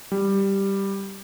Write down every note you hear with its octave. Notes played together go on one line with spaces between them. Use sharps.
G3